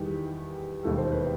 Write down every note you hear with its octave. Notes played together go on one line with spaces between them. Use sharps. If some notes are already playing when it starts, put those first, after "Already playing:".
Already playing: E2 D#3 G3 G4
E1 D#2 D#3 G3 A4
C5
B4